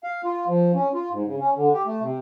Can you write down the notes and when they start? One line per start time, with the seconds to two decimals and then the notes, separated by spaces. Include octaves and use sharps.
0.04 F5
0.24 F4
0.47 F3
0.75 C#4
0.94 F4
1.11 G#2
1.25 C#3
1.40 C#4
1.56 D3
1.73 G4
1.86 A3
2.01 C3